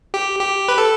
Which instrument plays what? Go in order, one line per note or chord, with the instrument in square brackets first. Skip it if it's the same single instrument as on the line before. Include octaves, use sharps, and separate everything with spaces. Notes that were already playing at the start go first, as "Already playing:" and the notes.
[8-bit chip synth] G4
G4
B4
A4